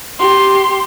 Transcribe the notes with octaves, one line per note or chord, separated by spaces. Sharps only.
G4 C6